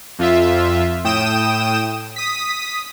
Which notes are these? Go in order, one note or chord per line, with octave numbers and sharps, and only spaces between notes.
F2 F4 E5
A2 G5 D#6 E7
D#6 B6